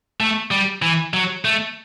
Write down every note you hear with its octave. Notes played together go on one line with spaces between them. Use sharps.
A3
G3
E3
F#3
A3